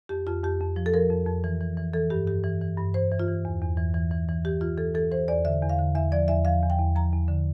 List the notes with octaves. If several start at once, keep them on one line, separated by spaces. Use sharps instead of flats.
F2 G4
F2 F4
F2 G4
F2
F3
A4
F3 A#4
F2
F2
E3
E3
E3
E3 A4
G2 G4
G2 G4
E3
E3
G2
E3 C5
E3
F4
E3
E2
E2
E3
E3
E3
E3
E3 G4
E3 F4
E3 A4
E3 A4
E3 C5
E2 D5
D3 E5
E2
F5
D3
E2 E5
F3 D5
E2 E5
F3 F5
E2
G5
E2
F3 A#5
E2
D3